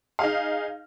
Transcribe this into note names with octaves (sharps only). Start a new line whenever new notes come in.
D#4 G#4 F5